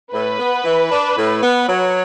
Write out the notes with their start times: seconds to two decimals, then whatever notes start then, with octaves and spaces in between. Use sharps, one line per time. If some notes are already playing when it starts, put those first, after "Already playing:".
0.13 A2 B4
0.39 B3
0.65 E3
0.90 D4
1.16 A2
1.42 B3
1.67 F#3 C#5